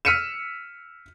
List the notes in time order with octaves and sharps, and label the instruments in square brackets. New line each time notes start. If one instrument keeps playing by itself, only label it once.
[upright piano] E6 F6 B6 C#7 D#7 E7